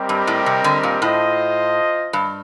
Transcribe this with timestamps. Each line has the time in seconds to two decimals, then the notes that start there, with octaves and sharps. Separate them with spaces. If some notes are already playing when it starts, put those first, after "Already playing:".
Already playing: G3 C4 G4 A#4 D#5
0.09 G2
0.27 A2
0.46 C3
0.64 D3
0.83 A#2
1.02 A2 F4 C5 D#5
2.13 G2